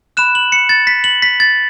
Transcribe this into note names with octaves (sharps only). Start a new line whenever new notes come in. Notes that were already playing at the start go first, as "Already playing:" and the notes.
B5 F#6 E7
F#7
C#7
A6
B6
F#7
B6
A6